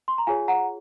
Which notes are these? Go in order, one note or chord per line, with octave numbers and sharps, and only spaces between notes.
C6
A#5
F4 G#4 C#5 F5 G#5
F#5 A#5